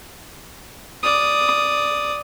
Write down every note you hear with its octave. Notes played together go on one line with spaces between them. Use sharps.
D5 D#6